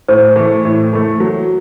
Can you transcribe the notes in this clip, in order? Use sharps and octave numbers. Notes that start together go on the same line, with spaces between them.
A2 C5
E3 A3
A2
E3 A3
F#3